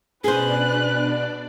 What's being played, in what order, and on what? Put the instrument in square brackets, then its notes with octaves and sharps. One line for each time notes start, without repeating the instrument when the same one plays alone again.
[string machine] B2 D4 D5 [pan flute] C#4 [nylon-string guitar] G#4 C5 [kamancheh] B4 F#6